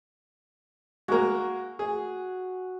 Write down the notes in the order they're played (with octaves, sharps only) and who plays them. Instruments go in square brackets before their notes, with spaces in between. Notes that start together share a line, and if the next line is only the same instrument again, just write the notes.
[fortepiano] G#3 A#3 [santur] F#4
[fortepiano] G#4